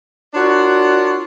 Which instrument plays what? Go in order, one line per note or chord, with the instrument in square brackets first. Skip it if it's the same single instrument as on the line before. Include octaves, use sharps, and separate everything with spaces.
[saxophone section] D4 F4 F#4 A#4 C#5 D5